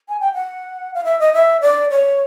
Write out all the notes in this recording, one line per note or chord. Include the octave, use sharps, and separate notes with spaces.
G#5
G5
F#5
F5
E5
D#5
E5
D5
C#5